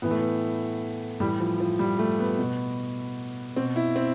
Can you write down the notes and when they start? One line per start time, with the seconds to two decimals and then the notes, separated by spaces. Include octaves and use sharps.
0.02 A2 E3 B3
0.11 A3
0.19 B3
1.20 A2 E3 G3
1.40 F3
1.60 F3
1.79 G3
1.99 A3
2.19 B3
2.39 B2
3.56 B2 C4
3.76 E4
3.96 C4